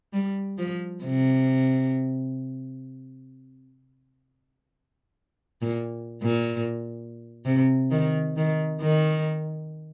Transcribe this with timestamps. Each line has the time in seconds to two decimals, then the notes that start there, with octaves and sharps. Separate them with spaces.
0.13 G3
0.58 F3
1.04 C3
5.62 A#2
6.23 A#2
7.45 C3
7.91 D#3
8.37 D#3
8.82 D#3